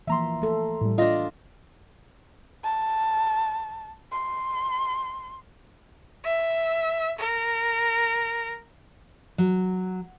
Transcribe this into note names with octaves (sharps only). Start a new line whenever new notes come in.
E3 F3 A#3 E5 A#5 C6
A3 A4
A2 G3
D4 F4 D#5 A#6
A5
C6
E5
A#4
F#3